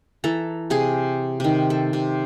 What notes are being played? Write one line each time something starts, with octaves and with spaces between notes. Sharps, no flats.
E3 A4 A#5
C3 G#4
C3 D#3
A4
C3